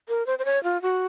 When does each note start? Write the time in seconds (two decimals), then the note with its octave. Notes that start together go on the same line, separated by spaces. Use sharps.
0.09 A#4
0.26 C5
0.39 C5
0.45 C#5
0.64 F4
0.82 F#4